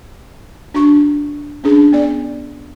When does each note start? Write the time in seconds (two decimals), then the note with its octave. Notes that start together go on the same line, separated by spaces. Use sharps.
0.74 D4 F#4 C#6
1.64 C#4 D4 G#4
1.93 B3 D5